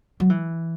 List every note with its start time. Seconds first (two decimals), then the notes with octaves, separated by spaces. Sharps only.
0.20 F#3
0.30 E3